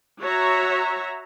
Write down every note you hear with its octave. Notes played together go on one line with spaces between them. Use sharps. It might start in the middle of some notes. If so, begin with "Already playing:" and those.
F#4 C#5 E5 A#5